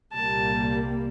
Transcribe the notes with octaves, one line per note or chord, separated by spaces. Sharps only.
C2 A#2 G3 A#3 A5